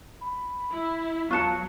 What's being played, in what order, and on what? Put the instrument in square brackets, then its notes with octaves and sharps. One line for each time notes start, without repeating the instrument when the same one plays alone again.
[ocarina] B5
[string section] E4
[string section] E2 F#3 [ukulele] F4 A5 [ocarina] C#5 [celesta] C#6 F#6 C#7